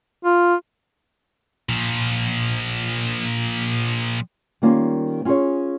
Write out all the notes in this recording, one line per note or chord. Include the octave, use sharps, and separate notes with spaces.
F4
A#2 F3
D#3 G3 A#3 C#4 F4
C#4 F4 G4 G#4 C#5